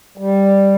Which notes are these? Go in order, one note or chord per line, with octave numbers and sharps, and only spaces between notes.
G3